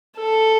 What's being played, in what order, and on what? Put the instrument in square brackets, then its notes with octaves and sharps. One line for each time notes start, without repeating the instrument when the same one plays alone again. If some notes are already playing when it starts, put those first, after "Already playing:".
[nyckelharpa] A4